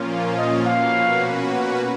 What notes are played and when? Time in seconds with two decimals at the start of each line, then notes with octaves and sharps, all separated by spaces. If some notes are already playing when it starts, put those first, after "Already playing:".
Already playing: A#2 F3 A#3 C#4 F4
0.38 D#5
0.66 B2 A#3 C#4 F#4 B4 F5
1.51 F#5